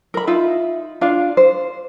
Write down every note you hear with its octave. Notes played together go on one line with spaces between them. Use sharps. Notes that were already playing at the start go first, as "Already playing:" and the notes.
A#4 B5
D#4 F4 E5
D4 F4 F5
C5